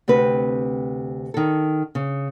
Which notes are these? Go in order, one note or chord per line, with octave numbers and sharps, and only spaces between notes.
D2 C3 C4 B4
D#3 A4
C#3